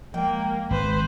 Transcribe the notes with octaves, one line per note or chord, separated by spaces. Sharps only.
F3 G#3 A#3 G5
G#1 B4 C5